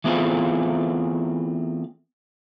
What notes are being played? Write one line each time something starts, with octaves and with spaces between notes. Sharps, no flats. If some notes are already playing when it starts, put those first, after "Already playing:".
E3 A3 B3 C4 F4 G#4